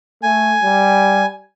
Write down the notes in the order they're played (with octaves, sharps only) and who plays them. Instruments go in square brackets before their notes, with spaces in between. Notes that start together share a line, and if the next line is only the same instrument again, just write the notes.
[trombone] A3 [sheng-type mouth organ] G#5
[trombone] G3